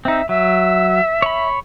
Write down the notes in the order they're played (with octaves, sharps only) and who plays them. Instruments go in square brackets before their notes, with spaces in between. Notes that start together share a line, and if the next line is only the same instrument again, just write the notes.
[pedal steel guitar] C4 D#4 [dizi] E5
[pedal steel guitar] F#3 [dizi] E5
[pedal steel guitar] C#5 B5